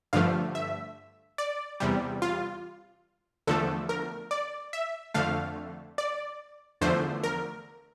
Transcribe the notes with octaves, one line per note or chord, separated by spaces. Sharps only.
G2 D3 F3 A3 F5
E5
D5
E2 C3 G3
F4
E2 D3 F3 A3 A4
A#4
D5
E5
F2 D3 A3 F5
D5
E2 D3 F3 A3 C5
A#4